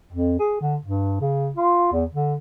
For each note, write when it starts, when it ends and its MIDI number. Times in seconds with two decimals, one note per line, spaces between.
0.13 0.38 41
0.39 0.59 68
0.61 0.77 50
0.85 1.17 43
1.21 1.51 49
1.56 1.89 65
1.92 2.05 40
2.13 2.35 50